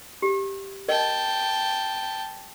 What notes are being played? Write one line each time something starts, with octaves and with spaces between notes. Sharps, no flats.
G4
A#4 D#5 G5 A5